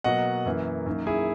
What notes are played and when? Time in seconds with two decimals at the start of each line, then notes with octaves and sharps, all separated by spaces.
0.04 B2 F#3 A#3 D#5 F#5
0.46 F#2 E3 A#3
0.86 F#2 D#3 A#3
1.07 E4 G#4